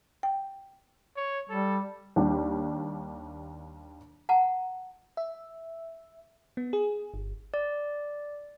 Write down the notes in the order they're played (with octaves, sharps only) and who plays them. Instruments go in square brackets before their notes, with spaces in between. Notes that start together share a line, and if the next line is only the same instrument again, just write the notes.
[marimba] G5
[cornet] C#5
[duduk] G3 [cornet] A4
[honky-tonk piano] D#2 G3 D4
[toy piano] F#5 A5 A#5
[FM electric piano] E5
B3
G#4
G1
[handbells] D5